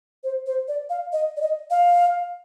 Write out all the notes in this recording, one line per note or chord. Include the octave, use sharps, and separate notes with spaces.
C5
C5
D5
F5
D#5
D5
D#5
F5